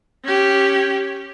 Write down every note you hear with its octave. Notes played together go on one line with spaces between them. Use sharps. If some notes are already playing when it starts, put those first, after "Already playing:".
C#4 G4